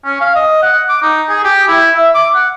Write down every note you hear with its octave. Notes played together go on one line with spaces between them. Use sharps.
C#4
F5
D#5
F#5
D6
D#4
G#4
G4
E4
E5
D6
F#5